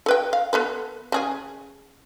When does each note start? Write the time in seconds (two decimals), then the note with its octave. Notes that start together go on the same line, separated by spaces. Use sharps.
0.06 A4 B4 G5
0.33 F5
0.53 B3 A4 B4
1.12 C#3 G#4 G#5